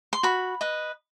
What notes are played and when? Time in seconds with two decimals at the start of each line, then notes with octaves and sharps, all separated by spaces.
0.13 C6
0.23 F#4 B5
0.61 B4 D#5